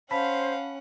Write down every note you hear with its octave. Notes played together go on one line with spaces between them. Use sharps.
C#4 C5 F5 F#5 A5 B5 B6